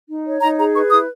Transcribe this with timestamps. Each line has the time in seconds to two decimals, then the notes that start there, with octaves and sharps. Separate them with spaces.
0.09 D#4
0.25 C#5
0.42 D#4 A#5
0.59 G#4 A#5
0.74 B4 C#6
0.91 E4 D#6